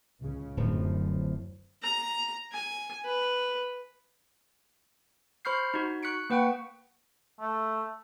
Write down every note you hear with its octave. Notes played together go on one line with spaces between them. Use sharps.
C#2 C#3
D1 F#2 A2 F3
A#5
G#5
B4
C5 B5 C#6 F6 G6 C7
D#4 F#4
C#6 F#6 B6 C#7 D7
A#3 B4 F#5 G5 C#6
A3